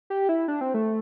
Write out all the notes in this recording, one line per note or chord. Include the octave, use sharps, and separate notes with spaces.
G4
E4
D4
C4
A3